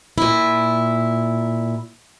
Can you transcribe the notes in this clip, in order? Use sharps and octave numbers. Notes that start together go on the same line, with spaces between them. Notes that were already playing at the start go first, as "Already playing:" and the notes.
A#2 E4